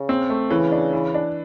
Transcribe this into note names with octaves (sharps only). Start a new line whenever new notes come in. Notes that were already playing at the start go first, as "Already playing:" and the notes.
Already playing: C#3
C4
A3
C#3 E3
D4
E3
D4